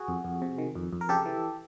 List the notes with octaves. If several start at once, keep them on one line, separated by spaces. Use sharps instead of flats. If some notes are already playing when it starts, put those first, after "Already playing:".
Already playing: F#4 G#4
F2
F2
C3
D#3
F2
F2
A#4
C#3 G4 A4
E3